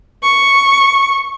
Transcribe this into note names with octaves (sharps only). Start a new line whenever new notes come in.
C#6